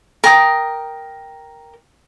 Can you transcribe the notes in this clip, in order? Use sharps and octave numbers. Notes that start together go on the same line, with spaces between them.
A#4 G5 D#6